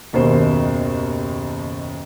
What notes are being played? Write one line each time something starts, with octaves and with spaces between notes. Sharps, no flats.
F#1 D#2 B2 C5